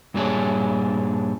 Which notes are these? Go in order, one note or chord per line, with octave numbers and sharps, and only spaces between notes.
G2 A#2 G3 D4 G#4 C#5